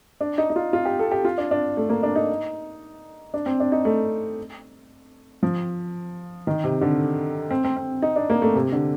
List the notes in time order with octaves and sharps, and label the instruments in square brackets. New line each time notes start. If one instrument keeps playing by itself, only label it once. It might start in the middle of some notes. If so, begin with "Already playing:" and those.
[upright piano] D4
D#4
D#4
F4
F4
G4
A4
G4
F4
D4
D4
A3
A#3
D4
D#4
D4
C4
D4
D#4
A3
F3
D#3
C3
D3
C4
C4
C4
D#4
D4
A#3
A3
C3
D3